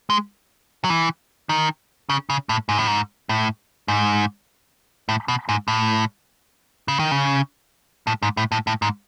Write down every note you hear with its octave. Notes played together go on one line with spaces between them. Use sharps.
G#3
F#3
E3
D#3
C#3
C#3
A2
G#2
A2
G#2
A2
G#2
A2
B2
G#2
A2
C#3
D#3
C#3
A2
G#2
A2
A2
A2
G#2